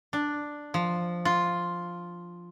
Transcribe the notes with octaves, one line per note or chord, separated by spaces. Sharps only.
D4
F3
F4